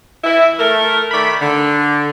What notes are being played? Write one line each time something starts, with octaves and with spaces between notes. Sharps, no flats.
E3 E4
A3 A#4
D#3 A3 D5 B5
D3